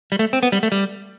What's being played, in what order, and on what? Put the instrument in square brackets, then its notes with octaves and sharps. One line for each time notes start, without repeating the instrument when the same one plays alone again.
[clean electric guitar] G3
A3
C4
B3
G3
A3
G3